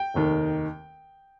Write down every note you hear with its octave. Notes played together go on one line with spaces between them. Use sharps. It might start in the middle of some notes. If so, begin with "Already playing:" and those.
Already playing: G5
F1 D#2 D#3